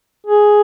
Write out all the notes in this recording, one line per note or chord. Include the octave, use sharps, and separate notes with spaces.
G#4